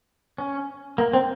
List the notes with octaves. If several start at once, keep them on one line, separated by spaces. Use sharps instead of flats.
C#4
A#3
C4